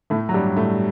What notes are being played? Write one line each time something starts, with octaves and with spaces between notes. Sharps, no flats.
A2 A3
F#3
G2 G3
A2 A3